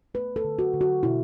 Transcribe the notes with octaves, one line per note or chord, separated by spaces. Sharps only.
A3 B4
A4
D3
F#4
D3
F#4
B2 E4